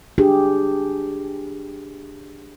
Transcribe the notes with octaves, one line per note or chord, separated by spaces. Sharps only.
D4 G4 G#4